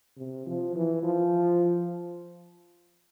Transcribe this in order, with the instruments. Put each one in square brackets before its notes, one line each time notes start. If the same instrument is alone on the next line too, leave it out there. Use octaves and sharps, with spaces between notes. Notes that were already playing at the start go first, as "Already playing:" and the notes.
[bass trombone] C3
F3
E3
F3